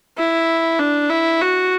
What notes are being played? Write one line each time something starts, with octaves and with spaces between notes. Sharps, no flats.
E4
D4
E4
F#4